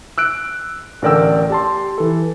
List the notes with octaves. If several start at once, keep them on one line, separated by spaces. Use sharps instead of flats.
E6 F#6 D7
A1 D3 A#4 D5 G5 E6
G4 A5 C6
E3 A4